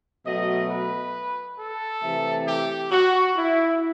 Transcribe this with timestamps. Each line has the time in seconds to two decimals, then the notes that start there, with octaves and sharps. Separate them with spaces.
0.25 B2 F#3 A3 D#5
0.69 B4
1.58 A4
2.03 C3 E3 A3
2.47 G4
2.91 F#4
3.37 E4